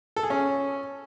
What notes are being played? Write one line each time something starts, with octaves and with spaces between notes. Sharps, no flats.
A4
G#4
C#4